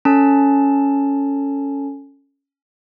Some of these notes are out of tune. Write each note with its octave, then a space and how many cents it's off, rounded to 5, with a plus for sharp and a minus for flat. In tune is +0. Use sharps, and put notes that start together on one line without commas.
C#4 +0 A4 +15 A5 +5